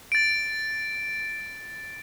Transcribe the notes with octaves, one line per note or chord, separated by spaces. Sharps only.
A6 D7